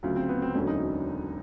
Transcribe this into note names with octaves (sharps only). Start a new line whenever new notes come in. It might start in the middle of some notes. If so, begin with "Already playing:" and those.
D2 C#3 F#3 F4
C4
B3
C4
E1 D2 D3 F#3 C#4
D#4